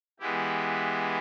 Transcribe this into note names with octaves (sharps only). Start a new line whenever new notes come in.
E3 G#3 B3 E4 G4